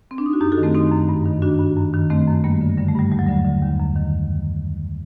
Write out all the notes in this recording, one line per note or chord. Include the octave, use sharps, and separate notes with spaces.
C4
D4
D#4
F#4
F#2 D#4 G4
F#4 A4
D#3
A3 C4
D#3 C4 D#4
F#2
G2
D#3
D#3 D4 F#4
G2
F#2
D#3
D#3 A3 C4
F#2
G2 G3 A#3
D3
D3 G3
A3
G2 G3
D#2 G3
F#3
D3 G3
D3
D#2
F#2
D#3